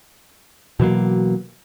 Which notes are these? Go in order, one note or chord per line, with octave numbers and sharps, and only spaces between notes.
B2 E3 F#3 A#3